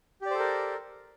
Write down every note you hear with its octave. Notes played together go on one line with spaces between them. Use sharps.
G4 A4 A#4 C5 D5